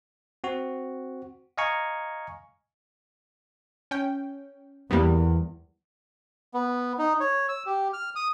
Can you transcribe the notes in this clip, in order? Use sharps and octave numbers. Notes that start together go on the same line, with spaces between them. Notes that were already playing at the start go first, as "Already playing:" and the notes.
C4 F#4
D#5 F5 G#5 A#5 C#6
C#4 G5
E2 G3 A#3 B3
B3
D#4
C#5
E6
G4
F6
D#6